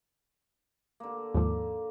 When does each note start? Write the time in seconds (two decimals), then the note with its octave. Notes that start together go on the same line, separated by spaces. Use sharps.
1.00 D3 A#3
1.34 D#2 G#2 F3